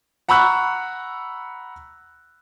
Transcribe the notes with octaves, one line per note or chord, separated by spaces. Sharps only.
F#5 A#5 B5 C#6 E6 F#6